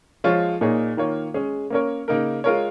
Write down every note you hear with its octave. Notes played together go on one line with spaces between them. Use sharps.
F3 G#3 F4 C#5
A#2 A#3 D#4 G#4 C#5
D#3 A#3 F4 C#5
G#3 C#4 G#4
A#3 C#4 A#4 C#5
C#3 A#3 D#4 A#4
G#3 F4 A#4 C#5